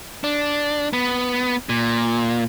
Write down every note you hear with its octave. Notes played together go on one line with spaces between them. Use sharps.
D4
B3
A#2